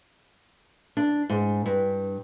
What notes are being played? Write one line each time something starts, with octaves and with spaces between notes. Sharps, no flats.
D4
G#2
G2